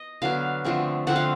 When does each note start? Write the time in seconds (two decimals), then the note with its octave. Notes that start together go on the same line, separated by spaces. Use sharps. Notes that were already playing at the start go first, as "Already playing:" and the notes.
Already playing: D#5
0.22 D3 F#3 B3 D4 F5
0.64 D3 F3 A3 C4
1.07 D3 F3 A3 C4 F#5
1.16 F5